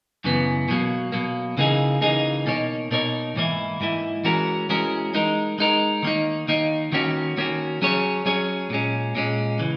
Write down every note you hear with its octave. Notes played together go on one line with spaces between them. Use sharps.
F#2 C#3 E3 B3
B2 F#3 A#3
B2 F#3 A#3
C#3 E3 A#3 D#4 G#4
C#3 E3 A#3 D#4 G#4
B2 A#3 D#4 A#4 C#5
B2 A#3 D#4 A#4 C#5
G#2 E3 A#3 E4
G#2 E3 A#3 E4
E3 G#3 C#4 F#4 A#4
E3 G#3 C#4 F#4 A#4
G#3 D#4 A#4
G#3 D#4 A#4
D#3 A#3 D#4
D#3 A#3 D#4
D#3 A#3 C#4 F#4
D#3 A#3 C#4 F#4
F#3 C#4 G#4 C#5
F#3 C#4 G#4 C#5
A#2 G#3 C#4
A#2 G#3 C#4
C#3 E3